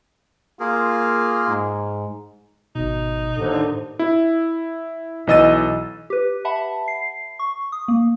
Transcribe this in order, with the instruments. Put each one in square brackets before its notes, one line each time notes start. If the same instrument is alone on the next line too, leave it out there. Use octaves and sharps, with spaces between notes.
[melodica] A#3 G#4 A#4 [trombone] F4
[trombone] G#2
[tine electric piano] G#1 B2 [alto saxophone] D#4
[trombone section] D#2 D3 [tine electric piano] A2 C5
[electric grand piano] E4
B1 E3 D#5 E6 A6 D#7
[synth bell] G4 B4
E5 F#5 A5 B5
C7
C#6
D#6
A#3